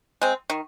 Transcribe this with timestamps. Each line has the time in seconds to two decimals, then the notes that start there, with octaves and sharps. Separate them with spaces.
0.22 G#3 C4
0.50 D#3